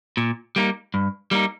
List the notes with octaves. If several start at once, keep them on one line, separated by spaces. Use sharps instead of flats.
A#2
G3 A#3 D#4
G2
G3 A#3 D#4